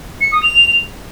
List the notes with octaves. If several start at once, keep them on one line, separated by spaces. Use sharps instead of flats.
C#7
D#6
F7